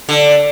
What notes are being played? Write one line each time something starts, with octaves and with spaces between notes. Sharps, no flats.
D3